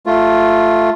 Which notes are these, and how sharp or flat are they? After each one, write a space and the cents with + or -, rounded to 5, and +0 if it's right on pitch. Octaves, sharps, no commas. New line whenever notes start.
A3 +0 F4 +0